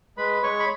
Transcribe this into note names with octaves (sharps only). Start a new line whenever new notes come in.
G#3 B4 B5
G#3 C#5 C#6
B5